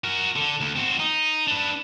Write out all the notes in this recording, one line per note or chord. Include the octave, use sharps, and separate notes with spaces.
F#4 A#4
D3
D2
C4 F#4
D#4
D4 B4